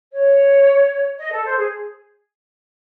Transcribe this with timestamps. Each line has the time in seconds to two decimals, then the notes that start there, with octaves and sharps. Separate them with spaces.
0.13 C#5
1.19 D#5
1.32 A4
1.45 C5
1.58 G#4